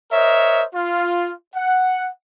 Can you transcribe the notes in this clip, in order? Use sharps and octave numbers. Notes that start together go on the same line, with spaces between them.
A#4 C5 C#5 D#5 E5
F4
F#5